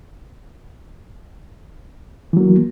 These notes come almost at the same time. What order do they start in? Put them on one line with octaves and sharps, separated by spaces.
E3 F#3 A#3